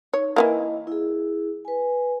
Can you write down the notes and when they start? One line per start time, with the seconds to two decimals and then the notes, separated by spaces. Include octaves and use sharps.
0.13 D#4 C#5
0.36 E3 G#3 A#3 E4 D#5
0.87 E4 G#4
1.65 B4 G#5